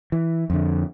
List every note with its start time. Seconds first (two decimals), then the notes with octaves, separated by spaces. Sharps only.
0.12 E3
0.50 F2 D3